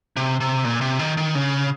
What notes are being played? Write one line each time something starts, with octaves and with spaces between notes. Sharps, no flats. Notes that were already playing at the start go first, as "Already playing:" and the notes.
C3
C3
A#2
C3
D#3
D#3
C#3